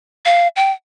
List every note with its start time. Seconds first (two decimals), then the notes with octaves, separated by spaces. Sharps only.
0.25 F5
0.56 G5